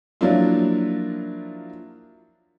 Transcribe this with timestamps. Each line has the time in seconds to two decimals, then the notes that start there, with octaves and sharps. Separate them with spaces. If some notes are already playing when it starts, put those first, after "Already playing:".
0.21 F3 F#3 A#3 D4 E4 F4